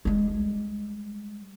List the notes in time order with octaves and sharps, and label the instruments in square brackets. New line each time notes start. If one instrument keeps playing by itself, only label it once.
[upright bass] G3 G#3